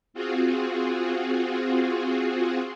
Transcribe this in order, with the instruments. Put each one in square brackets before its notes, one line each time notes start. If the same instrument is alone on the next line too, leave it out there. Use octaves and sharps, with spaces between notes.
[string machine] C4 F4 F#4 G#4